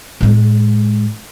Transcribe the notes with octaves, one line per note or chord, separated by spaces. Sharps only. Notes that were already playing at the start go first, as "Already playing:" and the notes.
A2 G#3